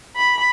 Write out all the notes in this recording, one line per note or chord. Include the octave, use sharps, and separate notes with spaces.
B5